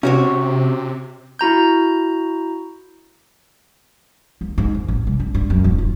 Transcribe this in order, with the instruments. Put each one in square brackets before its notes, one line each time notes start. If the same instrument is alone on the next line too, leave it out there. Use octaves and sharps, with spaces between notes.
[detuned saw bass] C3 [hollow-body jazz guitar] C#4 F#4 C#5
[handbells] E4 F#4 A#5 G6
[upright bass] D#2
G#2
D#2
A1
C2
G2
G2
F#2
D#1
F4